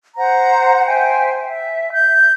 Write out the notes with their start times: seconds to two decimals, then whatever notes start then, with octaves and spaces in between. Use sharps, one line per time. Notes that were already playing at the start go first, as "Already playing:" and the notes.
0.17 C5 F#5 A#5
0.86 C5 E5 G5 G#5
1.44 E5
1.94 G6